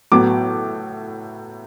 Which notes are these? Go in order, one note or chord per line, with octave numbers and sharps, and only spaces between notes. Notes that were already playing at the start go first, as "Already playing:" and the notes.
A2 F#3 B3 D6